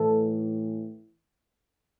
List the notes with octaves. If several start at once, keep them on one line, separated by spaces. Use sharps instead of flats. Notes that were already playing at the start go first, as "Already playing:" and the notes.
Already playing: A2 E3 A4